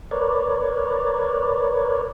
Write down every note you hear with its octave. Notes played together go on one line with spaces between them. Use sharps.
A#4 B4 C#5 D5